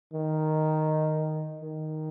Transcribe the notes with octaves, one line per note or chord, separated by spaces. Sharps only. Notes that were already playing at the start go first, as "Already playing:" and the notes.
D#3
D#3